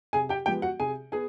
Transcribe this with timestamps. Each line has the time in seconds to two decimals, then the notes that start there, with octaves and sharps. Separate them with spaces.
0.13 C3 G#4 G#5
0.29 G4 G5
0.46 F3 G#3 B3 G4 G5
0.62 F#4 F#5
0.80 C3 G#4 G#5
1.12 B3 G#4 G#5